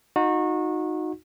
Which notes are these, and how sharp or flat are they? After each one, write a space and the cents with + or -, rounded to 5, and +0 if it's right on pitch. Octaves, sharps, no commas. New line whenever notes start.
D#4 +0 F#4 -30